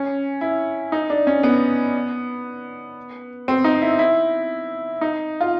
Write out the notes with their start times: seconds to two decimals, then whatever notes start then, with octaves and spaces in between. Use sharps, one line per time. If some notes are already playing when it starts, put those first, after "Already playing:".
Already playing: C#4
0.41 E4
0.92 D#4
1.10 D4
1.27 C#4
1.43 B3
3.48 C4
3.64 D#4
3.82 E4
3.99 E4
5.01 D#4
5.41 F4